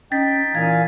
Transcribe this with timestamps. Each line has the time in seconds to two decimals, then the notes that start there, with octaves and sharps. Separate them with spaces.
0.12 C#4 D#4 G5 A6 B6
0.55 A#2 E3 F5 G#5 G#6